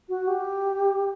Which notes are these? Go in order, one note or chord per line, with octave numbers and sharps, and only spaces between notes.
F#4
G4